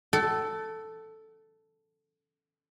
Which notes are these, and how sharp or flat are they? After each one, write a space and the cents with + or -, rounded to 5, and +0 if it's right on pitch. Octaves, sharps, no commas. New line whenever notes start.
A4 +0 F#5 +45